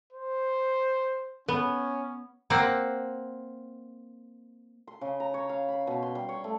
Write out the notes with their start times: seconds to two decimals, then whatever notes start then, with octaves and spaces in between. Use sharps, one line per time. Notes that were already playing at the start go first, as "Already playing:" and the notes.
0.12 C5
1.48 B3 C#4
2.50 A#3 C4 F#5
4.87 C6
5.01 C#3
5.20 A#5
5.34 C#5
5.49 F5
5.68 B5
5.87 B2
6.02 C6
6.15 G3
6.29 C#5
6.44 A3